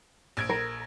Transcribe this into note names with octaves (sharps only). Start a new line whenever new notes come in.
A#1 G#6 D7
A#4